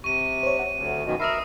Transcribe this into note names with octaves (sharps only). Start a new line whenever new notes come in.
C3 C#6 D#7
C5 C#5
F#5
D2
F#2 B2 D#3
A#4 E5 B5 D#6 A#6 C7